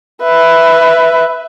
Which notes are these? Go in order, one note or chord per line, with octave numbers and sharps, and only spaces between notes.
B4 E5